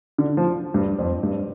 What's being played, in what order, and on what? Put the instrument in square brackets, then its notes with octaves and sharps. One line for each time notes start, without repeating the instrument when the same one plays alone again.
[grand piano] D3
F3
G2
F2
G2